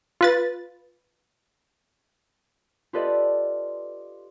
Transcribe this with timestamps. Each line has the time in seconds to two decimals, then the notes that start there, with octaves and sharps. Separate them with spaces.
0.21 F4 B4 A6
2.93 F4 G4 A4 B4 D5 D#5